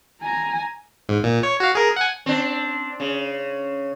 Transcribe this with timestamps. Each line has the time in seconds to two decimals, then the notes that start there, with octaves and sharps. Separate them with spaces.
0.21 G#5 A#5
1.09 G#2
1.23 A#2
1.43 C#5
1.60 F#4 F5
1.75 G#4 A#4
1.96 F#5 G#5
2.26 C4 D4
3.00 C#3